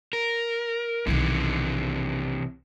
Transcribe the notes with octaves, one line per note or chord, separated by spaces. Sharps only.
A#4
B1 C3 D#3 E3